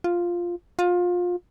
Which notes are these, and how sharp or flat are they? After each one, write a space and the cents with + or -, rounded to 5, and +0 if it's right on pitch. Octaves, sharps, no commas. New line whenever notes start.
F4 +0
F4 +25